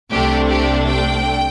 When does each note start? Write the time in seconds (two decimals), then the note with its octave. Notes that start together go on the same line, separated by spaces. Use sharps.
0.10 C2 C3 A3 D4 G4
0.49 G4
0.89 G5